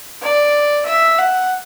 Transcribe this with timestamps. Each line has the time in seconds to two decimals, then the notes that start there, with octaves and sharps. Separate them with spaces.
0.22 D5
0.86 E5
1.19 F#5